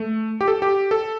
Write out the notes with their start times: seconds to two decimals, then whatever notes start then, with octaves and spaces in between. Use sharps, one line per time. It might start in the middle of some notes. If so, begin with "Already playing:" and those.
Already playing: A3
0.41 G4
0.48 A4
0.62 G4
0.91 A4